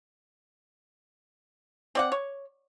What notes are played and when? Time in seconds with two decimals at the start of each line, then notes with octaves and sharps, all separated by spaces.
1.95 C4 D5 F#5
2.12 C#5